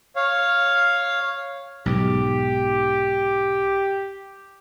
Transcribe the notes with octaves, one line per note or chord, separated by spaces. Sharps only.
C#5 F5
B1 G#2 B2 G4